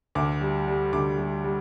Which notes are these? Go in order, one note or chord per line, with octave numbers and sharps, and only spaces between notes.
D2 D6
G3
G3
D2 D6
G3
G3